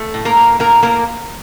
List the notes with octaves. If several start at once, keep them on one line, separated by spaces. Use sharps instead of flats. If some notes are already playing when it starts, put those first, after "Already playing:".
Already playing: A3
A2
A#3 A#4
A2
A2 A#3 A#4
A2 A#3 A#4